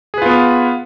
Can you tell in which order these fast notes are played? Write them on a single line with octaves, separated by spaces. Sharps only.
G#4 B4 F4 B3